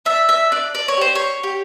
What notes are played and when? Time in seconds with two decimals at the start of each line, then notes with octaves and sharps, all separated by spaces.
0.05 D4 E5
0.29 E5
0.52 D4 D5
0.75 D5
0.88 C#5
0.97 G4 C5
1.15 C#5
1.43 G4